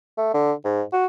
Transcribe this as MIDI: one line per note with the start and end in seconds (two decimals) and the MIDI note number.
0.17 0.32 57
0.34 0.52 50
0.65 0.82 44
0.93 1.06 66